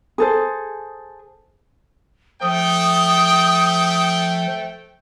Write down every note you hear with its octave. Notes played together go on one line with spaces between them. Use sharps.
G#4 A4 C5
F3 A3 G5 D#6